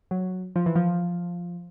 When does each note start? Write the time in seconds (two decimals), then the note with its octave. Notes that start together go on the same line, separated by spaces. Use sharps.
0.11 F#3
0.56 F3
0.66 E3
0.76 F3